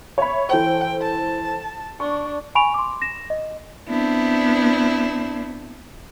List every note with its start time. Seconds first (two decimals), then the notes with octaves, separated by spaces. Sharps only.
0.18 C#5 E5 B5
0.49 E3 A4 C5 G5
1.01 A5
2.00 D4 C#6
2.55 G#5 B5 C#6 D7 F7
2.74 C6 D6
3.02 A#6 E7
3.30 D#5
3.88 B3 C4 D4 E4